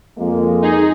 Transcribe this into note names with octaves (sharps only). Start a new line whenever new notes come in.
F2 G#3 A#3
D#4 G#4